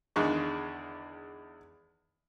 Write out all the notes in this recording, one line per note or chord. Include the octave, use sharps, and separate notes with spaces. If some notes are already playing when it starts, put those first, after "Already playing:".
E2 D3 D#3 G#3 C#6